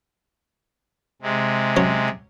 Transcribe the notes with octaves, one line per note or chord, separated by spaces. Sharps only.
C3 G#3
F#3 C#4